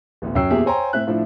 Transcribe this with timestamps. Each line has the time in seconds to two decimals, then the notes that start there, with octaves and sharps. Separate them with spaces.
0.22 A1 D2 B2
0.35 F#2 C#4 G5 E6 C7
0.50 E2 A#2 G4 G#4 E5
0.66 C5 C#5 G5 G#5 A#5 C6
0.93 A2 C4 E5 F#6
1.07 A2 F3 D4 E4